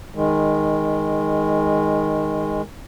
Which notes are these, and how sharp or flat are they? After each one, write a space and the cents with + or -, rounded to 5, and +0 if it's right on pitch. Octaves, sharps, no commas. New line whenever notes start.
D#3 +0 G#3 -15